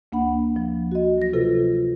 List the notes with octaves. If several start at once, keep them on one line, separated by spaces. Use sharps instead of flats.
D2 A#3 D4 F#5 B5
F3
F#4 D#5
F#3 A#6
C3 F4 A4 B4